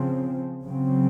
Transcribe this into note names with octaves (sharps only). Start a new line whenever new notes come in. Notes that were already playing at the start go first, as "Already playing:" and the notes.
Already playing: C#3 F3 C4
C#3 F#3 C4